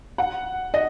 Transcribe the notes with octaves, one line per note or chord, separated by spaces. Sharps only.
F#5
D#5